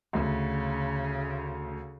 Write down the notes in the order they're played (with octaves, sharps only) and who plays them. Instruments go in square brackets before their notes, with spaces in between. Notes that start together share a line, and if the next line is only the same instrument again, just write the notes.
[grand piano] D2 [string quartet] C#3